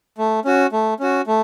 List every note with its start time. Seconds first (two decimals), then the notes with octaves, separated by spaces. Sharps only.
0.18 A3
0.45 C#4 F#4
0.72 A3
0.99 C#4 F#4
1.27 A3